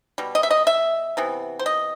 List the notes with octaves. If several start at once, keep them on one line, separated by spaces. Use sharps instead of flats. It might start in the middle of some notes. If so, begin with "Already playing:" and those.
B2 G3
D#5
E5
D#5
E5
C3 E3 B3
C5
D#5